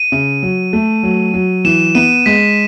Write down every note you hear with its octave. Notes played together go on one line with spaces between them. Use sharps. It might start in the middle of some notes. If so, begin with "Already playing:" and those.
Already playing: D#7
C#3
F#3
A3
F#3
F#3
E3 E7
B3 D#7
G#3 B6